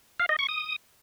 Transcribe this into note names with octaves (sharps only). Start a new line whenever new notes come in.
F5
D#5
C#6
D#6